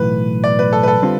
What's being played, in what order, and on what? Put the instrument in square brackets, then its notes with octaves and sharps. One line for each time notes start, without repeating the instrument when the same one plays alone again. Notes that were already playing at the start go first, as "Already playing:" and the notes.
Already playing: [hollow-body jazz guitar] B1 A2 E3 [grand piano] B4
[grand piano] D5
B4
A4
B4
A4
[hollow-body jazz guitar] D3 G3 C4 F4 B4